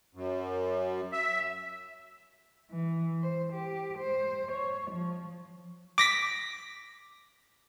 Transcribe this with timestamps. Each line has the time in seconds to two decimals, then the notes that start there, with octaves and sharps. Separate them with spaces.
0.15 F#2
1.13 E5
2.71 E3
3.23 C5
3.53 G4
3.98 C5
4.52 C#5
4.91 F3
5.98 D6 A#6 B6